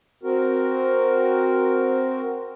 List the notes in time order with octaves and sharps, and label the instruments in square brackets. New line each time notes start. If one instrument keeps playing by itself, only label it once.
[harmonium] C4 F#4 A#4